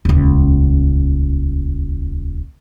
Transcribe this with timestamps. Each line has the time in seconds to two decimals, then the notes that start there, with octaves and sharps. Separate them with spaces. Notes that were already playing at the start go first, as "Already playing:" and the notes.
0.05 D#1 C#2